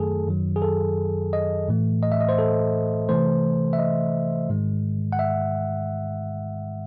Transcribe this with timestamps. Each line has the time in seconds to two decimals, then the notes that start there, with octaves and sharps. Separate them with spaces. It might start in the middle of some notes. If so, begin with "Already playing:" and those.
Already playing: F#2 D#3 F#3 A3 G#4 A4
0.27 F#2 D#3 F#3
0.56 G#4
0.62 A4
1.33 D#5
1.68 A2 E3 A3
2.03 D#5
2.12 E5
2.21 D#5
2.29 C5
2.39 A4
3.09 C3 E3 A3 C5
3.73 E5
3.79 D#5
4.49 G#2 D#3 G#3
5.12 F#5
5.19 E5